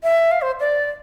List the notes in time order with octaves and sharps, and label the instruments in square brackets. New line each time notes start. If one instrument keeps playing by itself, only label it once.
[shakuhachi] E5
F5
C5
D5